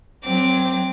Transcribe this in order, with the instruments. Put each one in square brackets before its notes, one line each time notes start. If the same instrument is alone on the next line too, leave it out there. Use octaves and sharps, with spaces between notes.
[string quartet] F#3 C4 D6